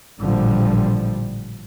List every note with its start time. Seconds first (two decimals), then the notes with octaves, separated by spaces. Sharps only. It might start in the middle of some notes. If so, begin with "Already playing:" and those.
0.19 A1 A#2 D3 F3 G3